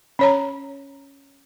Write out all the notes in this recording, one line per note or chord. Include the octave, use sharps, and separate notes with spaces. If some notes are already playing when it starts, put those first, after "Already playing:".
C#4 C#5 A#5